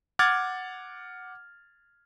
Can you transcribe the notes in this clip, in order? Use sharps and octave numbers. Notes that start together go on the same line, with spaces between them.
F#5 D6 F6 G#6 A6